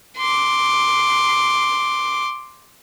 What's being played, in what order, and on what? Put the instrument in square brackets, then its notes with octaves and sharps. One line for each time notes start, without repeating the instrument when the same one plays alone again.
[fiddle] C6 D6